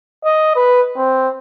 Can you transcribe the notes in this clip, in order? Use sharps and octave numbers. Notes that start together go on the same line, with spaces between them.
D#5
B4
C4